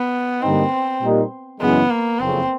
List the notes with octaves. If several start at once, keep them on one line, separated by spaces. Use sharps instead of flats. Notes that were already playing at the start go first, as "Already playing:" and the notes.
Already playing: B3
G2 D3 G3 A#3 C4 D#4
A#2 G3 A#3 D#4 G4
F#2 C#3 E3 G#3 B3
A#3
F#1 F2 C#3 C4